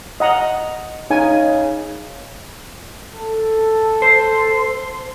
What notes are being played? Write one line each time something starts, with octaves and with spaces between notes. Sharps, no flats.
D#5 F#5 A#5
C#3 D#4 G#5
A4
C5